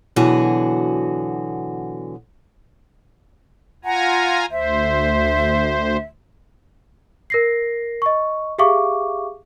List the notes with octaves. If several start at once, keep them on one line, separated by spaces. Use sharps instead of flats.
B2 D3 E3 F#3 F#4 G#4
F4 F#5 G#5 A#5
D2 C5 E5
A#4 A#6 C7
D#5 C#6
G4 G#4 E5 F5 C#6 D6